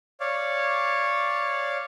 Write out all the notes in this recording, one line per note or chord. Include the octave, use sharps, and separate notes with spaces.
C#5 D5 F5